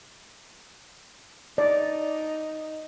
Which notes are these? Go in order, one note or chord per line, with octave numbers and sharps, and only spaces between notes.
D#4 D5